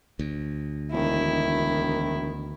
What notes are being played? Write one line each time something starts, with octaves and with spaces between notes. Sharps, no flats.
D2
E1 D#3 E4